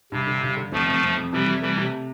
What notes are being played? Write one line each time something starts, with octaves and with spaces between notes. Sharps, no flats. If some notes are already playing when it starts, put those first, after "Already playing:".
G2 C3
D3
G2
D3
F1 F3 A3
F2
F2
F2
C3 E3 G3
C3
E3 G3 A3
C3